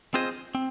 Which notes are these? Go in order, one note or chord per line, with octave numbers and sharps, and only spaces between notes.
C4 F4 G#4 C5 D#5
C4